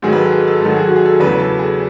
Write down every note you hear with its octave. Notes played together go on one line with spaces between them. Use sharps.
G#2 D#3 F#3 G#4
B4
A4
G#4
A4
G#2 D#3 F#3 A4
F#4
G#4
F#4
G#4
A4
E2 C#3 F#3 B4
B4
A4
G#4